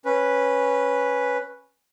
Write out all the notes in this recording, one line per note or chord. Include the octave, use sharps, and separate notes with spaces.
C#4 B4